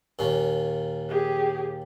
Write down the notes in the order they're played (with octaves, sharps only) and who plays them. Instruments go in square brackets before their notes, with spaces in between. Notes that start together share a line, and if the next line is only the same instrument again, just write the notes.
[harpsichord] D#2 A#2 C#4
[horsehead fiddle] G4 G#4